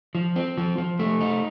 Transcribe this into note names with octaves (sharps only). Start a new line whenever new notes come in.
F3
C4
F3
F3
A3
D#4